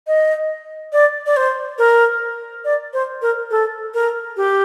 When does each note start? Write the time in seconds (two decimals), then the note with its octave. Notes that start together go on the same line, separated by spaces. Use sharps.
0.07 D#5
0.93 D5
1.26 D5
1.37 C5
1.78 A#4
2.65 D5
2.93 C5
3.22 A#4
3.51 A4
3.94 A#4
4.37 G4